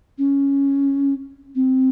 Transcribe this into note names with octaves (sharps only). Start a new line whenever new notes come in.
C#4
C4